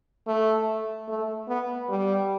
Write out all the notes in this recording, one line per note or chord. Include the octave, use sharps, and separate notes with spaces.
A3
A3
B3
G3